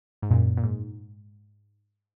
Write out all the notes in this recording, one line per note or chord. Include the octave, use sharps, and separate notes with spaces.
G#2
F#2 A#2
A#2
G#2